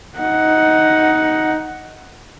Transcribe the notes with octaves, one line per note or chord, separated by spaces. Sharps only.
D#4 F#5